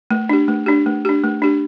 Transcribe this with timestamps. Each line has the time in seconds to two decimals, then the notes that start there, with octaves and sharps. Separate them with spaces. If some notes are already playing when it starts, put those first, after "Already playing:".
0.11 A3
0.29 D4 G4
0.48 A3
0.66 D4 G4
0.86 A3
1.05 D4 G4
1.24 A3
1.42 D4 G4